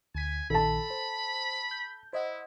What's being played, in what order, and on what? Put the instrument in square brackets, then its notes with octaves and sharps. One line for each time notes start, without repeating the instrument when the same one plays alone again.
[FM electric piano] D2 B6 [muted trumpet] G#5
[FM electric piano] A#1 D#3 [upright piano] A4 A5 [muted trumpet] B5
[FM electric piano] C5
G6
[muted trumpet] E4 [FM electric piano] C5 D#5 F#5